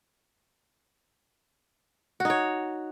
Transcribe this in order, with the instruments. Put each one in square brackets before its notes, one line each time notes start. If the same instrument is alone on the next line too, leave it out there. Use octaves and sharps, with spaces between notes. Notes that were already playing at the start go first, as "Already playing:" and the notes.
[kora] F#4
D#4
C#5